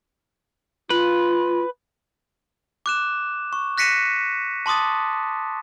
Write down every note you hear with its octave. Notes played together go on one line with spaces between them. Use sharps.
F4 B4
D6 F#6 E7
C#6
F#6 A#6 B6 C#7 D#7 E7
A5 C6 D6 D#6 A6